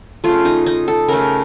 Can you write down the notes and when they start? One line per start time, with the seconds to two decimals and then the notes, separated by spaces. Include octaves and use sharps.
0.24 C#3 A3 F4
0.45 D#4
0.66 D#4
0.88 A4
1.08 C#3 A3 A#4